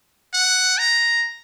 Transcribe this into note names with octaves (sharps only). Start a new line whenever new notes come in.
F#5
A#5